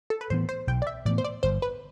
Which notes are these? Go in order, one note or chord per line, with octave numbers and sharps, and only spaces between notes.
A4
B4
A2 E3 B3 C5
C5
B1 G5
D5
E5
A2 E3 B3 D5
C5
D5
G1 C5
B4